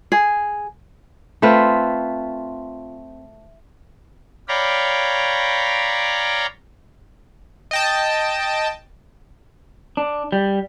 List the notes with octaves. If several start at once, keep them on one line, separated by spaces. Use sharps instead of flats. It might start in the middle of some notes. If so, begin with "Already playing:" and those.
G#4
A3 C4 F4 B4
C#5 D5 F5 G5 A#5 B5
D#5 G5 A5
D4
G3